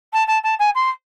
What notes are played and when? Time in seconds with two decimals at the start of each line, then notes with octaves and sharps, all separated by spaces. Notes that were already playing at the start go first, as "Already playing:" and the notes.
0.13 A5
0.27 A5
0.43 A5
0.59 G#5
0.75 C6